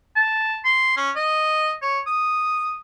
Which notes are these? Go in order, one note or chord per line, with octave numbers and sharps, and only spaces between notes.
A5
C6
C#4
D#5
C#5
D#6